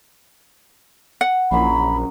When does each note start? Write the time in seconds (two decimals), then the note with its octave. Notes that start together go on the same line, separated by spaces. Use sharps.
1.21 F#5
1.51 A#1 F#2 F#3 B5 C6